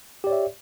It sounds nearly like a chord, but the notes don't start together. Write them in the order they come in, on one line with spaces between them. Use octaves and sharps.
G4 D5 C#5 E5